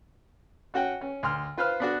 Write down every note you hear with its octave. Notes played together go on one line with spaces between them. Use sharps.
C#4 F#4 F#5 G5
C#4
D2 C6 F6
F4 B4 C5 F5 F6
B3 D4 F#4